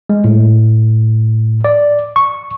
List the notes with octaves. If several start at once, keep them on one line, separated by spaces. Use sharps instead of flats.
G#3
A2
D5
C#6